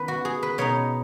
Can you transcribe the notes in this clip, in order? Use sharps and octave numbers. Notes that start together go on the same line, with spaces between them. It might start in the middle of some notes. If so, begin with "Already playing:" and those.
Already playing: D#3 B3 B4
F#4
G#4
B4
B2 B3 D#4 C#5